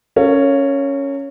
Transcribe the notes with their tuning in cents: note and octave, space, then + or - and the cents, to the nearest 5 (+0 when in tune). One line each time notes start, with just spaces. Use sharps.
C#4 +0 A#4 -40 F5 +0